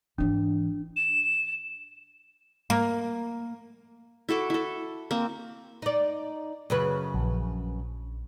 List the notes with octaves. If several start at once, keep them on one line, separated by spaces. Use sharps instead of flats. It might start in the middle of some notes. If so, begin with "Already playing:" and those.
G#1 E3 D4
E7
A#3
E4 F#4 A4 D6
E4 A4
A#3 C4
D#4 D5
F#2 C#3 B4
A#1